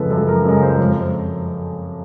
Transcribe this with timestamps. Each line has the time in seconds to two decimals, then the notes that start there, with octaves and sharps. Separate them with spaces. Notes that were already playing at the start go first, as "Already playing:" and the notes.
Already playing: F#2 C#3 F3 G#3 A4 B4
0.11 F#2 A4
0.28 A#4
0.45 C#3 F3 G#3
0.62 C5
0.73 C5
0.79 F2 C#5